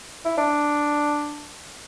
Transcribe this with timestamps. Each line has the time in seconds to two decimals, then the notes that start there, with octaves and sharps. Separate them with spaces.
0.25 E4
0.37 D4